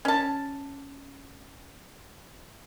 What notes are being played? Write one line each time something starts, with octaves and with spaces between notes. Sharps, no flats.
C#4 A5